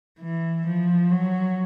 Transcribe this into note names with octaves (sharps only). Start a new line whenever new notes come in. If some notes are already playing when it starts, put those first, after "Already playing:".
E3
F3
F#3